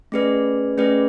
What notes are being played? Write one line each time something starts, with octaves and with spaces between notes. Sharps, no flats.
A3 C#4 G#4 B4 D5
A3 C#4 G#4 B4 D5